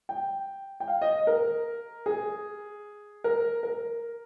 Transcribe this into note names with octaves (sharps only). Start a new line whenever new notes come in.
G5
G5
F5
D#5
A#4
G#4
A#4
A#4